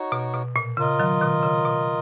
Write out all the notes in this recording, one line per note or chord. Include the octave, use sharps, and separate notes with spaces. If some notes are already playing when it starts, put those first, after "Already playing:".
Already playing: D#4 F#4 C#5
B2
B2
A#2
C#3 F4 A#4 D#5
D#3 F#3
B2 D#3
C#3
B2